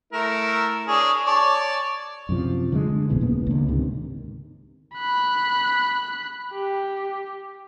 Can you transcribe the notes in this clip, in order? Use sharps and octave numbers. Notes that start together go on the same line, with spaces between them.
A3 E4 A#4
D4 G#4 C#5
C#5 D5 A5
F#2 C3 F3
D3 D#3 G#3
A#1 F2 B2 E3
E1 C#3 A#3 B3
C#2 D3
G#2 C3 D#3
B5 F#6
G4